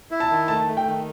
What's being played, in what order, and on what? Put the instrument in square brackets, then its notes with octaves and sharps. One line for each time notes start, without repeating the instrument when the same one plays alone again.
[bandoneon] E4
[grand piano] A5
[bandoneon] D#3
[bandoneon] A3 [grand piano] A5
[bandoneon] A3
[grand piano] G5
[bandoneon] D#3